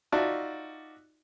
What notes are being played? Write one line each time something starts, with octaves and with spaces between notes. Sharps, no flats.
D#4 F4 F#4 D5 E5 A5